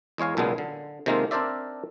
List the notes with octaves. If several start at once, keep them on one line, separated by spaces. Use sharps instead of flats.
E2 G#3 C#5 F5 G#5
B1 A#2 C#3 G#3 B3
D3
C3 D#3 G#3 A#3 F4 A4
C4 D4 A#4 C5 D5 E5